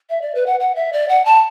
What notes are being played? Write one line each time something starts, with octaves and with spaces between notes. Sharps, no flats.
E5
D5
B4
F#5
F#5
E5
D5
F#5
A5